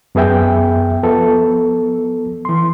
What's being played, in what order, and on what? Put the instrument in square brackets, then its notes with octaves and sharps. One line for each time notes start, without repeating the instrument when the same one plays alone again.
[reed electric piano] F#2 B3 G#4 E5 G5
F3 B3 A4
E3 C6